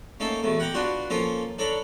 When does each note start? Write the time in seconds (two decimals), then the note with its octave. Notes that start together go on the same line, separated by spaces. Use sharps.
0.20 A3 A#3 C#4 D#4 A4
0.43 E2 B2 A3
0.60 F#5 G5 A#5 D6
0.74 B3 D4 F4 F#4
1.10 F3 A#3 C#4 F4 A4
1.58 D4 A4 C#5 A#5 B5